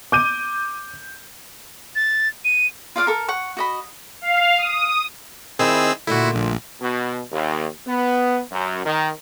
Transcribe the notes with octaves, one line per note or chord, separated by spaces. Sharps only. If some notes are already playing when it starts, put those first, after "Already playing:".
D6 G6 D#7
A6
D#7
F4 D5 F5 D6
A4 A#4
F#5 C#6
F#4 D#5 B5
F5
D#6
D#3 C4 E4 G#4 E6
A#2 D3 A3 E4 F#4
A#1
B2
D#2
B3
F#2
D#3